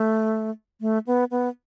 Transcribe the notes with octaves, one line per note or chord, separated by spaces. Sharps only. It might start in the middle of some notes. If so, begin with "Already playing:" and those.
Already playing: A3
A3
B3
B3